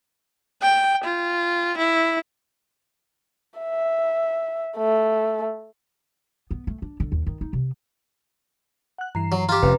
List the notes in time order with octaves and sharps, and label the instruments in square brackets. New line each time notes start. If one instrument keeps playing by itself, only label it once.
[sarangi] G5
F4
E4
[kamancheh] E5
A3
[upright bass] B3
A3
D4
D3
D#2
D#3
D#4
C3
[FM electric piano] F#5 F#6
[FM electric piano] G2 E3 C7 [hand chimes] A#5
[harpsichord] F#3
[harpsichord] F4 G4 [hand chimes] A#5
[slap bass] F1 [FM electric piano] C3 C#4 [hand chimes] B4